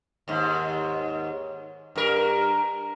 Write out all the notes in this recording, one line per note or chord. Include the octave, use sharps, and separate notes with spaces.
D#2 G#2
G2 A#4